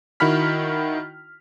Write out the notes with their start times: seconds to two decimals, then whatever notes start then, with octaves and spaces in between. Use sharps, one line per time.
0.20 D#3 E4 F#4 B5 F6 B6